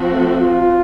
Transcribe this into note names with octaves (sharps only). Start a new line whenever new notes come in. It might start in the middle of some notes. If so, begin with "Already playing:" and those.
Already playing: F3 C4 F#4
A3
F4